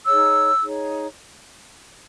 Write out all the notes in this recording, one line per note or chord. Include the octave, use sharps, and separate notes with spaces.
D#4 G#4 C#5 E6
D#4 G#4 C#5